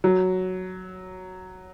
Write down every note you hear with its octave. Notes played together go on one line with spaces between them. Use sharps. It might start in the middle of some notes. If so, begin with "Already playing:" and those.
F#3